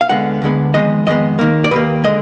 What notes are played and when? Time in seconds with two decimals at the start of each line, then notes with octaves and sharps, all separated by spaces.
0.01 F5
0.09 D2 D3 G#3 B3 F#5
0.42 D2 D3 G#3 B3
0.74 F2 D#3 G#3 B3 D#5
1.06 F2 D#3 G#3 B3 D#5
1.39 D#2 D#3 A#3
1.64 D5
1.71 D#2 D#3 A#3 B4
2.04 D3 G#3 D#5